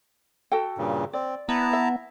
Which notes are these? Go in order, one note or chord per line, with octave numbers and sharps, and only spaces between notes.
F#4 A4 G5
G2 A#2 C#3
C4 D5
B3 E4 A5 A#5
E5